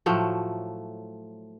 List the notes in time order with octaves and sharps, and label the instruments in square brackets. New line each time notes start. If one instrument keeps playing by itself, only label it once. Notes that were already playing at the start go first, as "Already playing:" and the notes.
[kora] A2 F3 F#3 A3